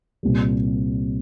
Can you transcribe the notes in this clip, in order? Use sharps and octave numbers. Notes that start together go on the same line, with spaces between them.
C2 A#2 G3